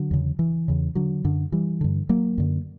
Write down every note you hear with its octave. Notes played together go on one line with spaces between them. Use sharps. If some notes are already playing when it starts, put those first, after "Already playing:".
Already playing: D3 F#3
E2 C#3
E3
E2 C#3
D3 F#3
F#2 D3
E3 G3
G2 D3
F#3 A#3
F#2 D3